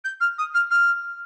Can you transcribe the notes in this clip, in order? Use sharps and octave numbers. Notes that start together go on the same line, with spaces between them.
G6
F6
D#6
F6
F6